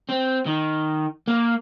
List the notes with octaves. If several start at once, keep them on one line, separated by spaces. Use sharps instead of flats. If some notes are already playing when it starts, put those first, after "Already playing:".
C4
D#3
A#3